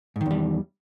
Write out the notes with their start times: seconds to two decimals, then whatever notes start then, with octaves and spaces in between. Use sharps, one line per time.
0.16 G#2
0.21 D#3
0.26 E2
0.31 G3